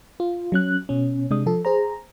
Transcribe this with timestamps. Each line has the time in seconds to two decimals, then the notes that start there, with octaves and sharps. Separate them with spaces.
0.20 F4
0.52 F#3 C#4 F#6
0.89 B2 C#4
1.31 C3 G#3 D4 D#6
1.46 F3 A4
1.65 G#4 C5 A#5